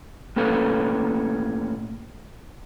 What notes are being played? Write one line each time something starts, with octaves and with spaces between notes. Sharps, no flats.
A2 A#3 C#4 A4 B4